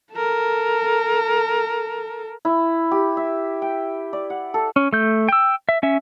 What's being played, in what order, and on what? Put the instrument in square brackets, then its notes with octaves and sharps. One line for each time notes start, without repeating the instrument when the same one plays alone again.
[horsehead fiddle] A4 A#4
[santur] E4
G4
E5
G5
D5
F#5
A4
[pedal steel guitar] C#4
A3 G6
G5 E6
E5
C#4 E5